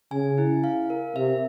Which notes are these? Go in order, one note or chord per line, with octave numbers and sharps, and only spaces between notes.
C#3 G#5
E4
F5
A#4
C3 E5